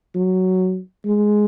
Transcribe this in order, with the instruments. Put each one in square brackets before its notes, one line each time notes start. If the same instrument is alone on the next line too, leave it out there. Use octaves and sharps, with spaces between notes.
[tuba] F#3
G#3